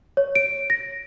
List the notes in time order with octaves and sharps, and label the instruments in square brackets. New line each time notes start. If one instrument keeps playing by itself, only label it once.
[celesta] C#5
D7
A#6